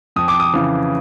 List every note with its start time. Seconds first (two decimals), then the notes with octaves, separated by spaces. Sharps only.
0.16 F2 D#6
0.28 D6
0.40 D#6
0.54 C#3 E3